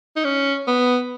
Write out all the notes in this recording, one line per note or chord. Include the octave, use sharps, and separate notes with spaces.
D#4
C#4
B3